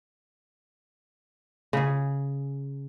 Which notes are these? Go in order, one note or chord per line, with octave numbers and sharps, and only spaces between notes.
C#3 G#4